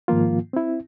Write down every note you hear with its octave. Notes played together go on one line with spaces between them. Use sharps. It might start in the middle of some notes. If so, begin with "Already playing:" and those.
G#2 D#3 F3 A#3 F4
C4 E4